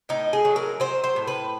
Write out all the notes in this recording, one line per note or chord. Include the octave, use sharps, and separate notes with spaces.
A2 D#4
G#4
F#3
A#4
F#3 C5
C5
A2
B4